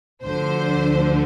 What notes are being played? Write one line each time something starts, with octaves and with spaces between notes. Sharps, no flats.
D2 D3 F3 C5